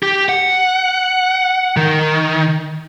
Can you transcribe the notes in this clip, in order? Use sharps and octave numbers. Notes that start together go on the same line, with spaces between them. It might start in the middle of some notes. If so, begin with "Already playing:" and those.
G4
F#5
D#3